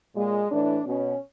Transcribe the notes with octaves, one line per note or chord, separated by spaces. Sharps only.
A#2 G#3
A2 E3 D4
B2 C#4